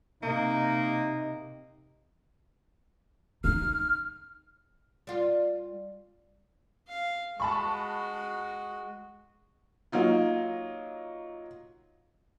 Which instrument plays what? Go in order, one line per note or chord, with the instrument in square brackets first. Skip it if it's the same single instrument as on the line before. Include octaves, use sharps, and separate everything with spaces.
[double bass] C3 [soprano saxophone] A#3 [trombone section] D#4
[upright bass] D#4 [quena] F6
[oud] G3 F4
[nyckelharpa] F5
[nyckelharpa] G#3 F#4 [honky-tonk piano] A5 B5 C#6
[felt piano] F#3 A#3 D#4 F4